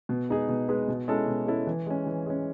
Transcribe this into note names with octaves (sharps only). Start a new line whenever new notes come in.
B2
G#3 D#4 G#4 B4
B2
G#3 D#4 G#4 B4
B2
G#3 C#4 E4 A4
B2
G#3 C#4 E4 A4
E3
G#3 C#4
E3
G#3 C#4